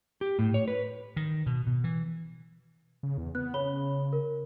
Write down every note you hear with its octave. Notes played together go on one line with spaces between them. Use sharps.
G4
A2
C#5
B4
D#3
B2
B2
E3
C#3
E2
B3 F#6
C#3 C#5 B5 G7
A#4